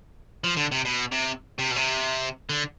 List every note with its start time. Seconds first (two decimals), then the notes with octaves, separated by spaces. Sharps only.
0.44 F3
0.57 D3
0.72 C3
0.85 B2
1.12 C3
1.59 C3
1.71 B2
1.77 C3
2.50 D3